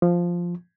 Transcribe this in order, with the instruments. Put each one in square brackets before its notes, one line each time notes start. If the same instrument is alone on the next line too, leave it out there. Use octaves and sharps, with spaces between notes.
[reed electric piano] F3